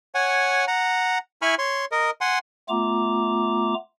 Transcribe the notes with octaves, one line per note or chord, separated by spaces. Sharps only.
C#5 F#5 G#5
F#5 A#5
E4 G#5 B5 C#6 F6
C#5 C6
A#4 D#5
F#5 G#5 C6
A3 B3 F4 A#5 D6